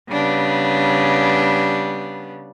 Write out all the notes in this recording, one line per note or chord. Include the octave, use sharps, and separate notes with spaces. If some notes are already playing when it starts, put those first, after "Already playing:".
C#3 G3 B3 D4